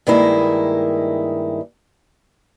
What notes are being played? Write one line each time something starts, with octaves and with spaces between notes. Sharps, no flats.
G2 D#3 G#3 A#3 D#4 E4